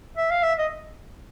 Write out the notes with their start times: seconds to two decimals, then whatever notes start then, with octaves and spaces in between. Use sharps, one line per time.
0.17 E5
0.30 F5
0.43 E5
0.59 D#5